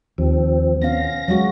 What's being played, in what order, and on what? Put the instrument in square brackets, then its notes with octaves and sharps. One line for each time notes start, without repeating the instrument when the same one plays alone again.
[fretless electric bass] D#2 [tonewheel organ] F3 C4
[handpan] B3 C#4 F5 [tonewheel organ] A#6
[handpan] F#3 G#3 F#4